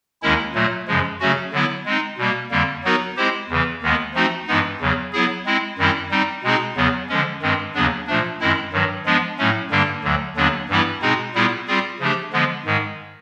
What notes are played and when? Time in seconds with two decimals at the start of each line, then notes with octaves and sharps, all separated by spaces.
0.22 D#2 D#3 G#3 C#4 E4
0.55 A#2 F#3 A3
0.88 F#2 C#3 F3 G#3
1.20 C#3 F#3 A3 C#4 F#4
1.52 D3 F#3 B3 E4
1.86 G#3 C4 D#4
2.18 B2 G3 A#3
2.51 F2 D3 G3 A#3
2.84 F#3 B3 D#4 F#4 A#4
3.17 G#3 C4 E4 G4 C5
3.49 E2 C#3 E3
3.82 D#2 D#3 G#3 B3
4.14 F3 A3 C4 D#4 F#4
4.47 G2 E3 G#3 B3 D#4
4.80 E2 C#3 F#3
5.13 F#3 B3 E4 G#4
5.46 G#3 C4 E4
5.78 F#2 D#3 G3 C4 E4
6.11 G3 C4 D#4
6.44 B2 G#3 C4 D#4 G#4
6.76 E2 C#3 F#3 B3
7.09 D3 F3 G#3 C#4
7.42 G2 D#3 G#3 C4
7.74 D#2 C#3 F#3 B3 D4
8.07 A#2 F3 A3 D4
8.40 F#2 D#3 G#3 C4 E4
8.73 G2 D#3 F#3
9.06 F3 G#3 B3 D4
9.38 A2 F#3 A3 C#4
9.71 G2 D3 G3 A#3 D4
10.04 D2 D3 F#3
10.36 D#2 D3 F#3 B3 D4
10.69 G2 E3 G3 B3 E4
11.01 B2 G#3 C4 D#4 G#4
11.35 A#2 G3 B3 E4 G#4
11.67 G3 C4 F4 G#4
12.00 C#3 F3 A3 D4 G4
12.33 D3 F3 G#3 B3
12.65 G#2 D#3 G#3